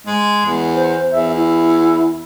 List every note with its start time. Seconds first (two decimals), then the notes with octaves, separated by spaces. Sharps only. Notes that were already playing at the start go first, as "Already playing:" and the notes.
0.06 G#3
0.45 E2
0.75 C5
1.11 E2 E5
1.34 E4